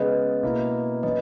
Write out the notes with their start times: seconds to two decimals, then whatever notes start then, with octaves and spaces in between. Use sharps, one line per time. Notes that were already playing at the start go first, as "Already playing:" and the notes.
Already playing: C#3 G#3 B3 B4 D#5
0.43 B2 A#3 E4
1.03 F#3 C#4 B4 D#5